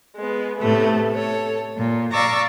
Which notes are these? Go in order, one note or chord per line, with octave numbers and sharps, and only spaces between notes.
G#3 B3
A2 C3 A3 B3
A4 C#5
A#2
D5 F5 A#5 C#6 D6 E6